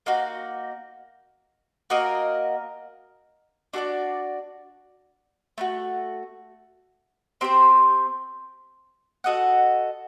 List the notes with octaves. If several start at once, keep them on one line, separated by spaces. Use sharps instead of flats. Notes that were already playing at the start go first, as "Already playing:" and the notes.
A#3 D#4 F#4
A#3 F#4 A#4 D#5
D4 F#4 A4 D5
A3 D#4 F#4
C4 G4 C5
F#4 A4 D#5 F#5